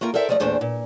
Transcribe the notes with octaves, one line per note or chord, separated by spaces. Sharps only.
A3 A#3 F4 A#4 G5
A4 A#4 C5 D5 E5 G5
F3 G3 A3 D5 D#5
E2 A#2 A3 D4 C5
A#2